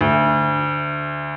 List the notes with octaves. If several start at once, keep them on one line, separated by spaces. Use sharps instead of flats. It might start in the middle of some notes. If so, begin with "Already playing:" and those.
D2